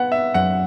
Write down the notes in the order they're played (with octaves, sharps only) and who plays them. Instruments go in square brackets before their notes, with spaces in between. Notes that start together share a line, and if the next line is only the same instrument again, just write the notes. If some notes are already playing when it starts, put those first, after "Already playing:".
Already playing: [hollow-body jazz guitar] B3 [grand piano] F#5
[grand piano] E5
[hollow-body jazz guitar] F#2 [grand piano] F#5